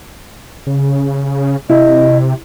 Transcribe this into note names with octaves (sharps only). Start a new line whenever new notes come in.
C#3
C3 E4 D#5